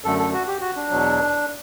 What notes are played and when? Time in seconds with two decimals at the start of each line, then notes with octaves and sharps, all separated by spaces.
0.04 F#2 D3 A3 A4
0.19 A4
0.33 F#4
0.47 G4
0.61 F#4
0.76 D4
0.90 E2 B2 F#3